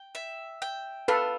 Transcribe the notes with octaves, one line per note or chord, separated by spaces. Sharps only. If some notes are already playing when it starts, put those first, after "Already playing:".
Already playing: G5
E5
G5
F4 A4 B4